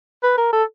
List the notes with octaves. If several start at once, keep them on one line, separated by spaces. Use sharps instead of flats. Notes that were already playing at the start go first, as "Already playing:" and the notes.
B4
A#4
A4